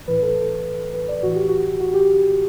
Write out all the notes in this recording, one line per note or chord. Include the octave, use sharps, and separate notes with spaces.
A2 E3 B4
A4
A4
B4
D5
A2 E3 F#4
G4
F#4
F#4
G4